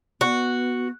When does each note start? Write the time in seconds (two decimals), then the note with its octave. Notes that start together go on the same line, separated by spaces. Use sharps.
0.21 B3 F#4